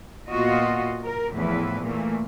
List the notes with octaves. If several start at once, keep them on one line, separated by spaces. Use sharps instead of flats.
A#2 B3 F4 F#4 D#5
A#4
E2 A2 F3 E4 B4
A#2 E3 A3 A#3